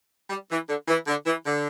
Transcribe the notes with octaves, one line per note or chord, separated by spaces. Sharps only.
G3
E3
D3
E3
D3
E3
D3